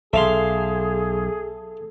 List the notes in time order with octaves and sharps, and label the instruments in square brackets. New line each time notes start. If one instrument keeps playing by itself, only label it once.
[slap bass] B1 [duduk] G#4 [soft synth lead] A4 [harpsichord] E5 F5 C6